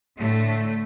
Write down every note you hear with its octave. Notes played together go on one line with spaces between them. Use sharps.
A2 D3 A3